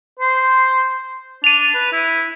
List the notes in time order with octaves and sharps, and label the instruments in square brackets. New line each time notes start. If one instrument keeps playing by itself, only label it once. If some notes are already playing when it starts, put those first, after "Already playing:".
[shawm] C5
[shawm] D4 [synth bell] D#7 F7
[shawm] B4
E4